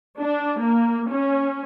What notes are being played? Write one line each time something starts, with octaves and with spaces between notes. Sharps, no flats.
D4
A#3
C#4